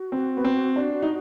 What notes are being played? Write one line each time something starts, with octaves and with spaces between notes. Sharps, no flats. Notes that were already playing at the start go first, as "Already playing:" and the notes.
Already playing: F#4
C4
B3
C4
D4
D#4